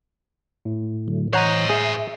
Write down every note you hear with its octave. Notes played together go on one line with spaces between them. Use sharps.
A2
D3 F#3 A3
E3 C5 C#5 D#5 F#5 A#5
G#4 E5